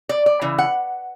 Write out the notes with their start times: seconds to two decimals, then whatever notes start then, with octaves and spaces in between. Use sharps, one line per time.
0.09 D5
0.26 D5
0.42 C#3 E3
0.58 F#5